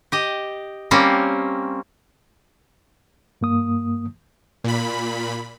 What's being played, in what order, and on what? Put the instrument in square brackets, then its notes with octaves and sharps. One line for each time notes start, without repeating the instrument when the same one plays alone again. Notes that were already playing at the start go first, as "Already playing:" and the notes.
[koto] G4 D#5
G3 A#3 C4 C#4
[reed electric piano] G2 A#3 D#6
[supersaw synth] A#2 B5